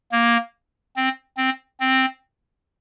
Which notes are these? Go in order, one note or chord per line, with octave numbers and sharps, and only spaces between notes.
A#3
C4
C4
C4